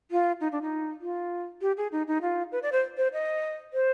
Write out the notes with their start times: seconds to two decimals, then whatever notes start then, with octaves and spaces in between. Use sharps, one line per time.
0.11 F4
0.41 D#4
0.52 D4
0.62 D#4
1.01 F4
1.61 G4
1.77 G#4
1.92 D#4
2.08 D#4
2.22 F4
2.52 B4
2.62 D5
2.72 C5
2.97 C5
3.13 D#5
3.73 C5